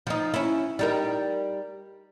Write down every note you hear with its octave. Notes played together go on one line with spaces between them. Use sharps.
F3 D#4
C#4 E4
G3 D#4 A#4